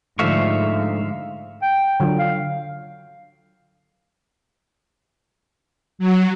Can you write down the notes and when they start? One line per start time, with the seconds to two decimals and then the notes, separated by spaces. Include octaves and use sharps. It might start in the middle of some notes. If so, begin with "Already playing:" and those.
0.19 G#2 D3 F3 A3 E5 F5 C#6
1.62 G5
2.00 D3 F#3 F4
2.19 F5
5.99 F#3